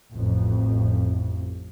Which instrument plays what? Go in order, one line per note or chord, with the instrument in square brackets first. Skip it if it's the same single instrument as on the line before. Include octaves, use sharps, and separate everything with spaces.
[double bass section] A1 F2